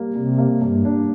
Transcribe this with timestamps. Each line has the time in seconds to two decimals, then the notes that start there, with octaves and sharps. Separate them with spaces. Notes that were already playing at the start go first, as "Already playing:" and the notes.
Already playing: G3 A#3
0.15 C3 G3
0.38 A#3
0.62 G2 A#3
0.85 D4